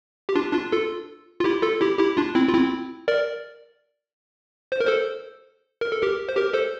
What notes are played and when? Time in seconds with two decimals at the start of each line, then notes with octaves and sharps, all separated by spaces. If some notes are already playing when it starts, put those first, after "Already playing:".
0.29 G4
0.35 D4 F4
0.53 D4 F4
0.72 F4 A4
1.40 F4
1.44 E4 G4
1.62 F4 A4
1.81 E4 G4
1.99 E4 G4
2.17 D4 F4
2.35 C4 E4
2.48 F4
2.54 C4 E4
3.08 A#4 D5
4.72 C5
4.80 A#4
4.87 A4 C5
5.81 A#4
5.91 A4
6.02 G4 A#4
6.29 C5
6.36 G4 A#4
6.53 A4 C5